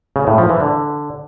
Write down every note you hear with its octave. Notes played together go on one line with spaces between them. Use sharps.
C#3
A2
F3
E3
D3